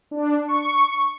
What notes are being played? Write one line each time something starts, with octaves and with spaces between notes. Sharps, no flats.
D4
C#6